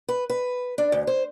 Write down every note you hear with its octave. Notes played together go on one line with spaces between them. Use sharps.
B4
B4
D4
D2
C5